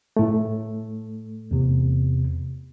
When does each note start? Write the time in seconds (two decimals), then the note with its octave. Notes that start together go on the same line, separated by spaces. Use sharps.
0.17 A2 A3
1.51 E2 C3